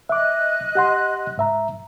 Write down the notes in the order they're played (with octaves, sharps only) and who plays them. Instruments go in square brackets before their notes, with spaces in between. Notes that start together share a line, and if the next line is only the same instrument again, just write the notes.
[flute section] D#5 F#6 [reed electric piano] E5 D6
[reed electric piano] G4 F#5 C6
G#2 E5 A#5